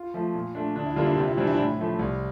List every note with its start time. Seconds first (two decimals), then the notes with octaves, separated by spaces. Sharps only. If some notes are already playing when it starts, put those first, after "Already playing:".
Already playing: F4
0.14 F3 A3
0.34 A#2
0.55 A3 D4
0.75 D2 D4
0.86 E4
0.96 D3 G3 A#3 D4 F4
1.06 E4
1.17 C3 F4
1.28 E4
1.37 E3 G3 C4 D4
1.47 E4
1.54 D4
1.58 A2 E4
1.79 F3 A3
1.99 C2